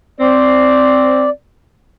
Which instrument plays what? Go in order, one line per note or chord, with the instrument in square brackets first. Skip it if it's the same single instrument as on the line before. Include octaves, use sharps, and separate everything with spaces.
[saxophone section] C4 [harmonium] D5